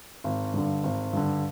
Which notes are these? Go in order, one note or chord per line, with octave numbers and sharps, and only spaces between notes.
G#1
G2 D3
G#1
G2 D3